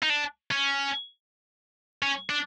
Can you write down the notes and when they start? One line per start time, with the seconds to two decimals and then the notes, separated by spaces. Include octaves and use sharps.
0.03 D#4
0.10 D4
0.51 C#4
2.03 C#4
2.30 D4